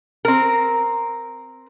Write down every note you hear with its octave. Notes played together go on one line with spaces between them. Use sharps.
C4 A#4